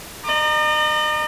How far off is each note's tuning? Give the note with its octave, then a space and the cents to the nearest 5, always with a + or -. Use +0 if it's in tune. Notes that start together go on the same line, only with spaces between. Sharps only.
D#5 -45 A#5 +0